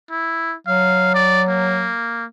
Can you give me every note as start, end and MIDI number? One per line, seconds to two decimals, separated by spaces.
0.10 0.55 64
0.67 1.91 54
0.67 1.13 77
1.14 1.43 74
1.48 2.25 58